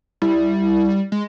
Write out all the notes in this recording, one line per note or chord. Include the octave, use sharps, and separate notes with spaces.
G3 E4
G#3